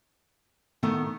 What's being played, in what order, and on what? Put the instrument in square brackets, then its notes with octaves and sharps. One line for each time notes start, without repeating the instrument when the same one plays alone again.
[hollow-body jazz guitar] A2 D#3 A3 [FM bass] B3